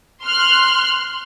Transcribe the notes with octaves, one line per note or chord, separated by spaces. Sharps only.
C6 F6 F#6